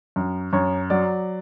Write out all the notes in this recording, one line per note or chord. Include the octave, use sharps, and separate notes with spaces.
F#2
F#2 C#5
F#3 D5